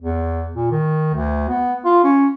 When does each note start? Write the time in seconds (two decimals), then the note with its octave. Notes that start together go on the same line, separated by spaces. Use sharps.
0.02 E2
0.56 A#2
0.72 D#3
1.14 D2
1.49 B3
1.85 F4
2.04 C#4